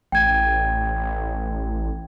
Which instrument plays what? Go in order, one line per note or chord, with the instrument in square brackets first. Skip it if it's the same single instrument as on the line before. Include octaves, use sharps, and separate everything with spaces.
[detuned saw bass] A1 [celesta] G5 G#6